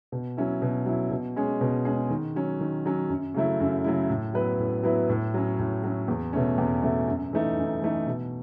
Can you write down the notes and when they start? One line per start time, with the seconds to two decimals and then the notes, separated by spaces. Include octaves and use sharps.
0.12 B2
0.37 F#3 C#4 E4
0.62 B2
0.86 F#3 C#4 E4
1.11 B2
1.36 G#3 C#4 G#4
1.61 B2
1.85 G#3 C#4 G#4
2.10 D#3
2.36 F#3 C#4
2.61 D#3
2.86 F#3 C#4
3.09 F#2
3.34 C#3 F#3 A3 E4
3.60 F#2
3.84 C#3 F#3 A3 E4
4.10 A2
4.34 F#3 B3 E4 B4
4.59 A2
4.84 F#3 B3 E4 B4
5.09 A2
5.34 F#3 C#4
5.59 A2
5.84 F#3 C#4
6.08 E2
6.33 B2 A3 C#4
6.58 E2
6.83 B2 A3 C#4
7.08 F#2
7.33 E3 A3 D#4
7.57 F#2
7.82 E3 A3 D#4
8.07 B2